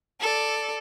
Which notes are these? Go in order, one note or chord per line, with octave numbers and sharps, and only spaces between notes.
A4 D5